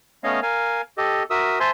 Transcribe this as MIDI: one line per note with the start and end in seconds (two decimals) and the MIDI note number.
0.24 0.40 57
0.24 0.40 59
0.24 0.40 61
0.24 0.40 73
0.24 0.40 75
0.24 0.40 77
0.42 0.81 70
0.42 0.81 77
0.42 0.81 80
0.98 1.23 67
0.98 1.23 69
0.98 1.23 75
1.30 1.59 66
1.30 1.59 70
1.30 1.59 76
1.30 1.59 87
1.30 1.59 88
1.60 1.71 72
1.60 1.71 76
1.60 1.71 80
1.60 1.71 81
1.60 1.71 84